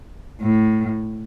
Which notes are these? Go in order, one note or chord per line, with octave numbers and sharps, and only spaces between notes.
A2